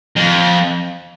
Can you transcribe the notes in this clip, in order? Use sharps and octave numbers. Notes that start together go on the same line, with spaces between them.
F2